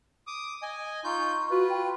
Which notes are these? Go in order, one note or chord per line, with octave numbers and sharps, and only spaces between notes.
D6 D#6
D#5 G#5
D#4 F4 C#6 G6
F4 F#4 B4
G5